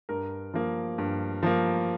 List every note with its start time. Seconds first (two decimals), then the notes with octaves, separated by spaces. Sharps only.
0.09 G2 A#4
0.54 F3 A#3
0.98 G2
1.43 F3 A#3